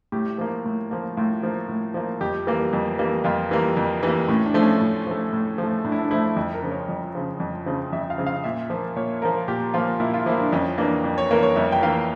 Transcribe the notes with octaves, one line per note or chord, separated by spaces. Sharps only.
A2 G4
F3 A#3
A2
F3 A#3
A2 F4
F3 A#3
A2
F3 A#3
F2 G4
E3 G3 A#3
F2
E3 G3 A#3
F2 F4
E3 G3 A#3
F2
E3 G3 A#3
A2 C#4
D4
F3 A3
C#4
A2
F3 A3
A2
F3 A3
A2 D4
E4
D4
F3 A3 E4
F2
A#4
C#3 F3
C#5
F2
C#3 F3
F2
C#3 F3
F2 E5
F5
C#3 F3
F5
A#2 E5
F3 A#3
A#2 C#5
F3 A#3 A#4
A#2 G4
F3 A#3 F4
A#2 E4
F4
F3 A#3 E4
D4
F2 C#4
E3 A#3 D4
F2
C#5
E3 A#3 A#4
C#5
F2 E5
G5
E3 A#3 F5